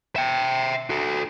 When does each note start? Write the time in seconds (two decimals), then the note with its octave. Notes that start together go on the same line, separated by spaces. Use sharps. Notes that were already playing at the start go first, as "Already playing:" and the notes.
0.16 E5 G5
0.90 F#4 A4